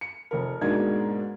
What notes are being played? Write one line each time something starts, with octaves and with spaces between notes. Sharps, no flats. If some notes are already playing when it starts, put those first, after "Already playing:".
C#7
F1 A#4
G#2 B2 G#3 A#3 D4 G#6